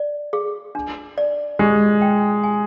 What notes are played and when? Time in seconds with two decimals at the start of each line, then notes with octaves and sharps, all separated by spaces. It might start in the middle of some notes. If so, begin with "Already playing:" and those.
Already playing: D5
0.33 G#4
0.75 D4
1.18 D5
1.59 G#3 G4
2.02 G5
2.43 G#5